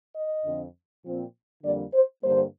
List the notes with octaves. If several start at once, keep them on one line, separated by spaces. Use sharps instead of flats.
D#5
F2 D3 F3 C4
A#2 F3 C4
F2 D3 G3 A#3 D5
C5
G2 D3 G3 A#3 C5